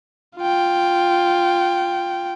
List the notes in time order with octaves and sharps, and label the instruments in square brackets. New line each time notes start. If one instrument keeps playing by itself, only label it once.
[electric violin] F4 G5